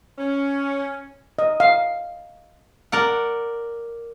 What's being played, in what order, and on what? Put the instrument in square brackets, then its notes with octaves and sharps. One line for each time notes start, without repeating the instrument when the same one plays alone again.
[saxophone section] C#4
[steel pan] D#5
F5
[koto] A#4 D5 F#5